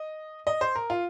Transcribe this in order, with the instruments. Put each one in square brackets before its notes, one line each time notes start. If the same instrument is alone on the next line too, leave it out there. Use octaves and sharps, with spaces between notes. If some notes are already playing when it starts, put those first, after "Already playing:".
Already playing: [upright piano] D#5
D#5
C5
A#4
F4